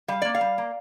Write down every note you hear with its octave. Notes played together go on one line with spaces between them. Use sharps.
G3 F5
A#3 D5
F5
G3
A#3